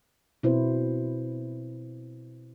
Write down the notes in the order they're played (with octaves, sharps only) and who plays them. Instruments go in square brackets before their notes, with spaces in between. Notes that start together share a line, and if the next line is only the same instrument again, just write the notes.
[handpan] B2 C4 E4 B4 C5